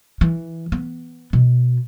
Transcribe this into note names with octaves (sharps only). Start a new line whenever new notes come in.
E3
B3
B2